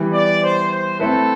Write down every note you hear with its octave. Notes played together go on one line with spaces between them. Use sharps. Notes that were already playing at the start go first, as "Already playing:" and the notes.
Already playing: E3 G3 B3
D5
C5
C5
A3 C4 E4 A4 B4